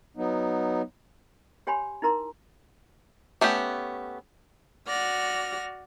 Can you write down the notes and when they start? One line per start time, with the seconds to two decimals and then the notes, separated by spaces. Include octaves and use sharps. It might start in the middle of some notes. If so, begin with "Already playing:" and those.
0.17 F#3 B3 D#4
1.67 G4 C#5 G5 G#5 B5 C6
2.02 D#4 E4 A#4 A#5 C6
3.41 A3 B3 C#4 G4
4.87 F#4 D5 F6 A#6